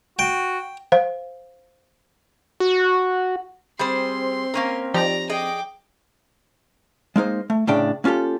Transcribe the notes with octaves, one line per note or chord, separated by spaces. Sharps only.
F#4 G5
C5 F5
F#4
G3 C4 G#4 C5 C6
A#3 C#4 A#4
F3 D#4 G4 D5 A#5
G#4 D#5 G5 D6
G#3 A#3 D#4 C5
A3
A2 C#3 D4 G5
A#3 C#4 F4 G4 A4